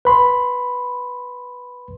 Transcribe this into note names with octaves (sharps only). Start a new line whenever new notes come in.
B4 B5 C6